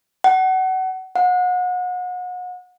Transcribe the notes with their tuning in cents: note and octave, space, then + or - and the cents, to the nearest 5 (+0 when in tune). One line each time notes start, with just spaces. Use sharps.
F#5 +25
F#5 -35